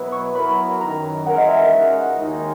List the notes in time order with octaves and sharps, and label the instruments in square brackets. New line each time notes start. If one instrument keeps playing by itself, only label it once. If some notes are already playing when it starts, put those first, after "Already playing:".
Already playing: [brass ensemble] B2 F#3 B3 E4 B4
[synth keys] C#6
[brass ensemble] F#3 B3 E4 A#4 [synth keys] B5
[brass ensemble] F#2 D#3 F#3 [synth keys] A#5
[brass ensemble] E3 G#3 C#4 F#4 A#4 [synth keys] F#5
[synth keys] D#5
E5
[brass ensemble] C#2 C#3 G#3 D#4 F#4
D#2 D#3 G#3 D#4